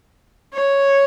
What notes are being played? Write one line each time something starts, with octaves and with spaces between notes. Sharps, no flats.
C#5